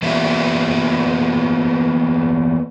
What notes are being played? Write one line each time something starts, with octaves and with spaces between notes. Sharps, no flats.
E3 A#3 B3 F4 G4 E5